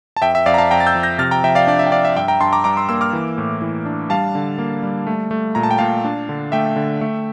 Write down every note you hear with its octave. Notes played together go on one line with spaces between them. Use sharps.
A5
F2 E5 G5
E5
F2 D5 F5
A#5
F5 A5
F2 G5 A#5
A6
E6 G6
F3
G6 A#6
C3 F6 A6
G5 A#5
F3 E5 G5
D5 F5
D4 D5
E5
G5
D4 D5 F5
E5
G2 E5 G5
G5 A#5
G2 A5 C6
A#5 D6
G2 A#5 D6
C6 E6
A#3 C6 E6
D6 F6
E3
A2
E3
D4
G3 F5 A5
D3
A#3
G3
A3
A3
A#2 A#5
A5
G5
A#2 F5 A5
D4
D3
A3 E5 G5
D3
A3